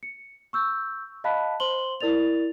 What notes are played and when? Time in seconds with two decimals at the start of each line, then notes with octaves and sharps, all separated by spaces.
0.03 C#7
0.53 C#6 E6 G6
1.24 D#5 F5 A5 B5 F#6 B6
1.60 C5 C6 F#7 G7
2.01 E4 A#4 D5 A6 F7